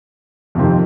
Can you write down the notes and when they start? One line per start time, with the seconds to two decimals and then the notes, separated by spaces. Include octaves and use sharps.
0.55 F2 C3 D#3 C4